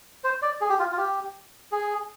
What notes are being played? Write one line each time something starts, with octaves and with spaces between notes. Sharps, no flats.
C5
D5
G#4
G4
F4
F4
G4
G#4